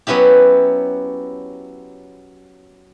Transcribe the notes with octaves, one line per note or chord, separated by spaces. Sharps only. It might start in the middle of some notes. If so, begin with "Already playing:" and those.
F#3 B3 C#4 E4 G4